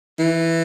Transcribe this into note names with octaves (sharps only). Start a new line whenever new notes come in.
E3